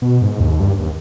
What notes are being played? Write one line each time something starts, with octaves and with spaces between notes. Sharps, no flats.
B2
G#2
D#2
G2
D#2